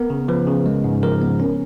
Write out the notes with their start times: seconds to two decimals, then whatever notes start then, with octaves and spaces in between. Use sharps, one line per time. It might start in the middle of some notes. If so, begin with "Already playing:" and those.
Already playing: B3 A#4
0.10 C#3
0.28 F3 B4
0.47 C#3
0.66 G#3
0.84 G#2
1.03 F3 A#4
1.21 B3
1.40 C#4